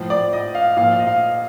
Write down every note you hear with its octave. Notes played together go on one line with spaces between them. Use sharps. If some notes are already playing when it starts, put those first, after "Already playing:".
Already playing: A2 F3
D5
D#5
F5
A#2 F3 F5
D#5
F5